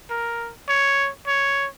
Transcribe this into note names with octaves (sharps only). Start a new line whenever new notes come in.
A#4
C#5
C#5